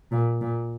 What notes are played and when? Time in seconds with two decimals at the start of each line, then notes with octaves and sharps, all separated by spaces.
0.12 A#2
0.41 A#2